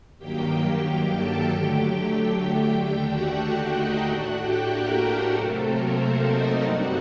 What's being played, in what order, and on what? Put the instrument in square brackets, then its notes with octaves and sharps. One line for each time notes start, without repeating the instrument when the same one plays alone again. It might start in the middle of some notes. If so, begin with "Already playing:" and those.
[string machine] G2 D#3 F#3 A#3 G4 G5
G4 G5
G4 G5
A4 A5
D3 F#3 A3 G4 G5
G4 G5
G4 G5
D#2 D3 A3 D4
F#4 F#5
F#4 F#5
D#4 D#5
A2 A3 D4 F#4 F#5
G4 G5
A#3 A#4
C3 F#3 A3 C4 A4
A#3 A#4
C4 C5
D#4 D#5
G2 D3 G3 C4 D#4 F#4 F#5